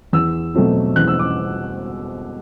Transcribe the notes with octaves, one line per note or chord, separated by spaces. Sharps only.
E2 E6
B2 F#3 A3 C4
E2 F#6
E6
D6